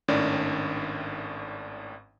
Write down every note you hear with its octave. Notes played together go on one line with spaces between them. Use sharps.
G#1 A2 D#3 C#4 D4 D5